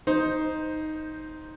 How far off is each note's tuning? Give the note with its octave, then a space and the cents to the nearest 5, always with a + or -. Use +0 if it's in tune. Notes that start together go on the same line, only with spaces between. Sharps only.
D#4 +0 C5 +0